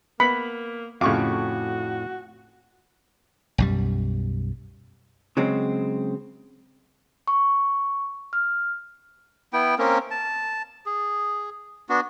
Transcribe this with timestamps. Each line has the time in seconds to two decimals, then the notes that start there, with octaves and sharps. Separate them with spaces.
0.20 A#3 B3 B5
1.01 F2 A2 C#3 F#4 F5 C#6 D6
3.58 B1 F#2 G3
5.37 C#3 F#3 G#3 C4
7.27 C#6
8.33 F6
9.53 B3 E4 G5
9.79 A#3 C4 C#4 A#4
10.11 A5
10.86 G#4
11.89 B3 D4 F#4